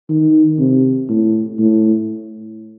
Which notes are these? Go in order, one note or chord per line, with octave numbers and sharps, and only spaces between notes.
D#3
C3
A2
A2